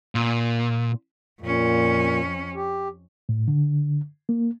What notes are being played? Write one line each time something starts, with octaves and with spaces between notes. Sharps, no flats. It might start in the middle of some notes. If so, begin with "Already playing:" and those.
A#2
F2 A#2 C#4
G4
A2
D3
A#3